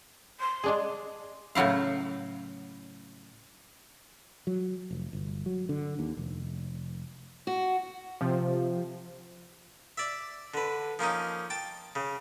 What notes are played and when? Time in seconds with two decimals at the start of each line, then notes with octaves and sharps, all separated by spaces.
0.40 C6
0.64 G#3 D4 G#4
1.55 A2 C#3 F#3 E4 F5
4.47 F#3
4.91 F1
5.13 G1
5.46 F#3
5.69 D3
5.99 D#2
6.17 F1
7.47 F#4
8.21 C3 F3
9.97 D5 E5
10.54 D3 B4
10.99 F3 A#3 C#4 D#4
11.50 G5 A5
11.95 C#3